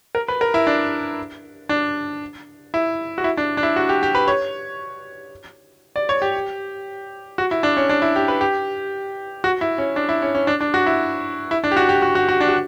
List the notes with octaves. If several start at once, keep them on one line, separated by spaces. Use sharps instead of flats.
A#4
B4
A#4
E4
D4
D4
E4
F#4
E4
D4
D4
E4
F#4
G4
G4
B4
C#5
D5
C#5
G4
F#4
E4
D4
C#4
D4
E4
G4
B4
G4
F#4
E4
C#4
D4
E4
C#4
C#4
D4
D4
F#4
E4
E4
D4
G4
F#4
G4
F#4
F#4
F#4
D4
F#4